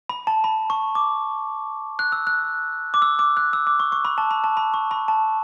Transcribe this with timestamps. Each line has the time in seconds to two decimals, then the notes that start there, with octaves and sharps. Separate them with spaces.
0.09 B5
0.27 A5
0.44 B5
0.70 C#6
0.95 D6
1.99 F#6
2.12 E6
2.27 F#6
2.94 D6
3.02 E6
3.19 D6
3.37 F#6
3.53 E6
3.67 D6
3.80 C#6
3.92 C#6
4.05 B5
4.18 A5
4.31 B5
4.44 A5
4.57 B5
4.74 C#6
4.91 B5
5.08 A5